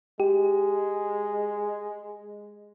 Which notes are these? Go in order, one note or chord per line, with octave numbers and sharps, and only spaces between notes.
G#3 G4